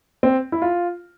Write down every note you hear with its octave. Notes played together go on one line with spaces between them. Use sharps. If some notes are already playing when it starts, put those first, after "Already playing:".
C4
E4
F4